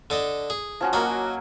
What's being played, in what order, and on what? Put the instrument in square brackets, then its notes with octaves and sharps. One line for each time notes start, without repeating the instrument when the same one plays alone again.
[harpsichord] D3 A4 D#5
G#4
[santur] F3 C#4 F#4
[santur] F#3 A#3 A#4 [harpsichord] F#4 D#5